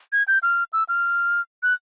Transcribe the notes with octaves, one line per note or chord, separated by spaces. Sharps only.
G#6
G6
F6
E6
F6
F#6